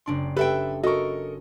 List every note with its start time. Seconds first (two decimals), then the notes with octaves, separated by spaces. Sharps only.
0.06 F#1 D4 C6
0.37 G4 A4 B4 E5 G5
0.84 F#4 A4 A#4 D#5 C#6